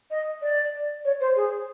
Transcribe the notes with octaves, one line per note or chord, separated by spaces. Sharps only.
D#5
D5
C#5
C5
G#4